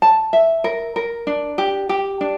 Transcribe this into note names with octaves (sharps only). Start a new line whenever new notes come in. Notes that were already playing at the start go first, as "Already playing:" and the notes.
A5
E5
A#4
A#4
D4
G4
G4
D4